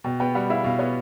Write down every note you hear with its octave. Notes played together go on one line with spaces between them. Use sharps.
B2 G5
B3 G5
G3 F#5
E4 F5
B2 F5
B3 C#5